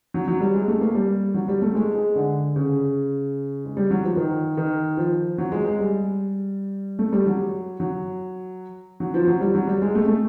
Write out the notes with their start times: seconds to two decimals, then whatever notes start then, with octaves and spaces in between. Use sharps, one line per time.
0.14 F#3
0.28 F#3
0.40 G3
0.54 G#3
0.68 A3
0.81 A#3
0.95 G3
1.34 F#3
1.48 G3
1.62 A3
1.75 G#3
1.95 G#3
2.15 D3
2.56 C#3
3.65 G#3
3.77 G3
3.91 F#3
4.04 F3
4.17 D#3
4.57 D#3
4.97 F3
5.38 F#3
5.52 G#3
5.65 G#3
5.79 G3
6.99 A3
7.12 G3
7.26 F#3
7.80 F#3
9.00 F#3
9.14 F3
9.27 F#3
9.41 G3
9.55 F#3
9.67 G3
9.82 G#3
9.95 A3
10.08 A3